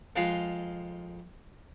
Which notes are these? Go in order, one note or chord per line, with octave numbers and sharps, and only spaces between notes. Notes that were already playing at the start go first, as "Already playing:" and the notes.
F2 G#3 F4 F5